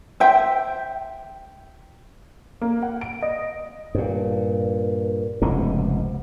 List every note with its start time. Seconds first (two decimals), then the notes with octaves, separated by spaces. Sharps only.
0.20 C5 E5 G5
2.62 A#3
2.83 F#5
3.01 D7
3.22 D#5
3.95 G2 A#2
5.42 F1 C#2 G#2 B2